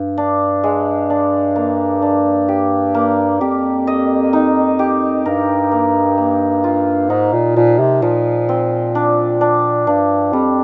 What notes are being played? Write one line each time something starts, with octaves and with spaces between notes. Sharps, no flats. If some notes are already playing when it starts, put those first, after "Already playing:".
Already playing: G2
D4
G#3
D4
A#3
D4
G4
A#3
F2 G4
D#5
D#4
G4
G2 A#4
A#3
A#3
F4
G#2 D#4
A#2
A#2 F3
C3
A#2 F3
C4
D4
D4
G2 D4
F2 G3